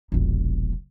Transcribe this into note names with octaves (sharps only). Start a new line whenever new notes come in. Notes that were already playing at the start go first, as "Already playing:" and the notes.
E1 A#1